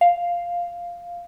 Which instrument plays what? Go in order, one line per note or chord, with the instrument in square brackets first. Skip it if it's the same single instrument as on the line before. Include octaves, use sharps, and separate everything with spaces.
[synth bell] F5